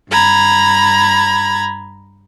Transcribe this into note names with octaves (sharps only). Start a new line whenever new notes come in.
G2 A#5 B5 G#6